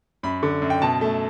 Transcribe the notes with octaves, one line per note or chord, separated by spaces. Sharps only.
F#2 B5
D3
F#2
G5
B2 A5
A3